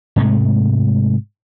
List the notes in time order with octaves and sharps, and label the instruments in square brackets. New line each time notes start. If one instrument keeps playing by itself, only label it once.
[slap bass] G#2 C3 G#3 A3